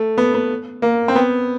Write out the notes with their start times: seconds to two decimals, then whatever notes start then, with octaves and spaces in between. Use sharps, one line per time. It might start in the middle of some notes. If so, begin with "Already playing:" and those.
Already playing: A3
0.18 B3
0.34 B3
0.82 A#3
1.08 C4
1.15 B3